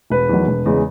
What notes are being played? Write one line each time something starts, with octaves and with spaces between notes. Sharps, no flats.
E1 B4
E2 D#3 F#3
E1
E2 C#3 G#3